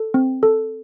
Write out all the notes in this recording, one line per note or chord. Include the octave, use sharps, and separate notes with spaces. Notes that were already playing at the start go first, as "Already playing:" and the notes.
Already playing: A4
C4
A4